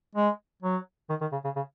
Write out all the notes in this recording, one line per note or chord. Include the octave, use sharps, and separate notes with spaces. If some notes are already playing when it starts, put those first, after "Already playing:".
G#3
F#3
D#3
D#3
C#3
C#3
C#3